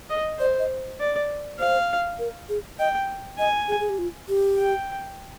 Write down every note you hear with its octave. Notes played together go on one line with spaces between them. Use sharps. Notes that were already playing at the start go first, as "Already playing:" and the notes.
D#5
C5 D5
D#5
D5
C5 F5
A#4
G#4
D#5 G5
D#5 G#5
G#4
G#4
G4
F4
G4
G5